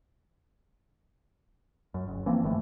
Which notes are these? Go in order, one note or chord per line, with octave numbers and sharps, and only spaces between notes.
F#2
F#1
E3 F3 A#3 C4
G1 D#3 E3 A3